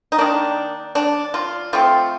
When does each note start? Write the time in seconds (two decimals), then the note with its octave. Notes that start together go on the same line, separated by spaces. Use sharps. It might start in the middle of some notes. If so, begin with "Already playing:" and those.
0.12 D#4
0.18 D#3 A#3 D4
0.95 D4
1.34 F4
1.73 F3 A3 C4 F4